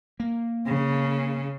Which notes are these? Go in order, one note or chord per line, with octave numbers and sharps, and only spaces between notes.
A#3
C#3